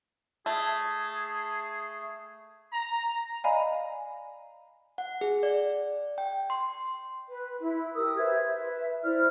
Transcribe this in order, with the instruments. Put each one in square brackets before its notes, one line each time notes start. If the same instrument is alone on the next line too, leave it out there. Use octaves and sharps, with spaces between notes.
[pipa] A3 [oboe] G#4
[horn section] A#5
[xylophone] D5 D#5 F5 G#5 A#5 B5
[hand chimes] F#5
G#4
D5
G5
C6
[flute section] B4
E4
G4 A#4 D#6 E6
B4 C5 E5 G#6
B4 E5
E4 C5 D5 F6